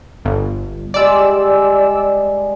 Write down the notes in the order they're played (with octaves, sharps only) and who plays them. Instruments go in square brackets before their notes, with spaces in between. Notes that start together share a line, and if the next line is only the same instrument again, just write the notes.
[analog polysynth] G1
[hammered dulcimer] G3 G#3 A#5 [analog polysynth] D5 E6